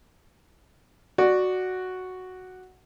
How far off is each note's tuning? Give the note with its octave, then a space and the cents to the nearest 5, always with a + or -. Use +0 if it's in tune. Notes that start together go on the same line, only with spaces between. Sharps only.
F#4 +0 D5 +10